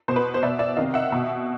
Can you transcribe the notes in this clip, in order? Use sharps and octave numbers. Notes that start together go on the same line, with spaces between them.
B2 C5
B4
C5
B2 D5 E5
D5 E5
C3 D#3 D#5 F5
E5 F#5
B2